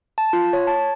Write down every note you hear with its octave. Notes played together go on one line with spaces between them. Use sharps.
A5
F4
C#5
A5